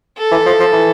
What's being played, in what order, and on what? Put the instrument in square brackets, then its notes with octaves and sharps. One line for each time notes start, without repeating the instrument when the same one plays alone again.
[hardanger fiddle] A4
[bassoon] E3
F3
F3
E3